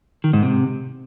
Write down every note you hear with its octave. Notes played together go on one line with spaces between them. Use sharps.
D#3
G#2
C3